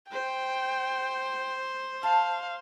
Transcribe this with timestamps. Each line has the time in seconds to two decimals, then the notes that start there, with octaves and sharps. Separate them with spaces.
0.11 C5 G5
2.03 F5 A5